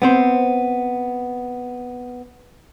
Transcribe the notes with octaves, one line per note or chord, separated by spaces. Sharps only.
B3 C4 C5